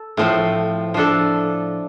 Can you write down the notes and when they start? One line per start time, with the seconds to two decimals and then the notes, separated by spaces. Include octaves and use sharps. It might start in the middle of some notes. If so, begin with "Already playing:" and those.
Already playing: A4
0.17 A2 F3 C4
0.94 F3 D4 A4